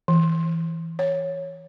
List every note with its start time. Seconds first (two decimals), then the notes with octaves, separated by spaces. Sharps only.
0.08 E3
0.99 C#5